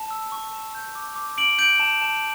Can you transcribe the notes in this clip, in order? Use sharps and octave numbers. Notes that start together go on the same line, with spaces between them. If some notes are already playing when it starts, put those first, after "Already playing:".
Already playing: A5
E6
C#6
A5
G6
D6
D6
D6 D7 F#7
G6 D7 F#7
A5
A5